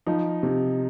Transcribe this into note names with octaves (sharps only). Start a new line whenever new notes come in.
F3 D#4
C3